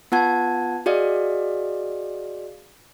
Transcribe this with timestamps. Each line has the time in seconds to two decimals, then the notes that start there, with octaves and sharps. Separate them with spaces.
0.12 B3 F4 F#5 A5 G#6
0.86 F#4 G#4 D5 D#5 F5